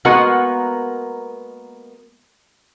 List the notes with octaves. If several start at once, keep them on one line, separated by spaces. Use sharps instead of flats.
G#3 A#3 B3 F#4 A#4 F#5